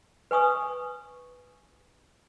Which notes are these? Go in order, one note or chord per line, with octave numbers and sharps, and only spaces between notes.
B4 G#5 C#6 D#6